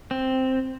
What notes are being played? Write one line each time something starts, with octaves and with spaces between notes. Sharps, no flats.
C4